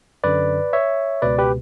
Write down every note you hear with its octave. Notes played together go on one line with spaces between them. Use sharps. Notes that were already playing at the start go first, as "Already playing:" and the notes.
F#2 D3 B4 D5
C#5 E5
C#2 B2 B4 D5
G4 B4